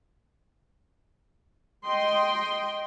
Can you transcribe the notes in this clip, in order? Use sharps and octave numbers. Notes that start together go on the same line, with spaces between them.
D#5 G5 C6